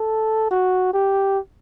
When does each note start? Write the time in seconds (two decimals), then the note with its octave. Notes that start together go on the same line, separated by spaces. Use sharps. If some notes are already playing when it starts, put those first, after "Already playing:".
Already playing: A4
0.51 F#4
0.94 G4